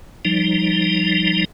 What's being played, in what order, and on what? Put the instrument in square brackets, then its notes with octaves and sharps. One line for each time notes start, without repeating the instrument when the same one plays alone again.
[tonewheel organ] F3 G3 D#4